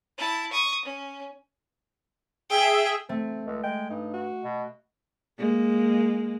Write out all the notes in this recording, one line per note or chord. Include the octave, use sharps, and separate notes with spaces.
E4 A5
C#6 D#6
C#4
G#4 E5 G5
A3 C4
C#2
G#3 G5
G2 D#4
F#4
B2
G#3 A#3